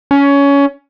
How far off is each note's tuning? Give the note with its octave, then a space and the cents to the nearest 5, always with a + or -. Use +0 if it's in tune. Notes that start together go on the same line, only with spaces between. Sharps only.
C#4 +20